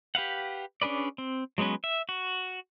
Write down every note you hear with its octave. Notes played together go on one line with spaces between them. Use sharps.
G4 B4 F5 F#5
C#4 D4 G#4 B4 D5
C4
F#3 G#3 B3 C#4 B4
E5
F#4